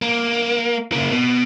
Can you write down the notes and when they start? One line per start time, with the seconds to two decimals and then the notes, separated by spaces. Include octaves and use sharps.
0.02 A#3
0.92 C#3 A#3
1.11 B2